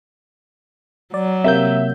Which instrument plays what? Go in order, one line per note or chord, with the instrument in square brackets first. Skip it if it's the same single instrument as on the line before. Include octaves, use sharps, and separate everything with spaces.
[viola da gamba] F#3 [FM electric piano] D5
[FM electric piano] C3 A#3 G6 [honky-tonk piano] E5